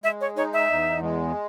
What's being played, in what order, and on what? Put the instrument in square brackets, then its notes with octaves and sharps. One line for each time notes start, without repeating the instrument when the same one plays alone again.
[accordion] G#3 [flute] E5
[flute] C#5
[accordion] D#4 [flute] C#5
[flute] E5
[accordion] E2
G#3